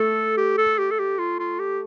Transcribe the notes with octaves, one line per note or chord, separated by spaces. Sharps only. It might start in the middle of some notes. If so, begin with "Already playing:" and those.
Already playing: A3 A4
G4
A4
G4
A4
G4
F4
F4
G4